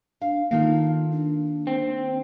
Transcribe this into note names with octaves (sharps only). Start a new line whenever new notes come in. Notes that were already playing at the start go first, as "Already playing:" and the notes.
D4 F5
D#3 A#3 D#4 F4 A4 F5
D4
C4